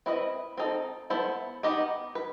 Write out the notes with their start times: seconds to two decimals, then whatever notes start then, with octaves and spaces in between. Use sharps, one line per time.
0.06 C4 E4 B4 D#5
0.58 C4 D#4 A4
1.10 B3 E4 A4 C5
1.63 B3 D#4 G4 D#5
2.15 B4